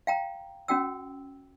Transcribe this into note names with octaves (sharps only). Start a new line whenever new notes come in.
F5 G5 A#5
C#4 F#4 G5 E6